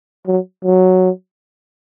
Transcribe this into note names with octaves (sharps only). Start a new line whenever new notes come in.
F#3
F#3